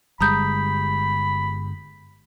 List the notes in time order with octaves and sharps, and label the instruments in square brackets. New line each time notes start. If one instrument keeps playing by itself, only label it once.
[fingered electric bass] G1 G3 G#3 [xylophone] A#5 D#6 G6 [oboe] B5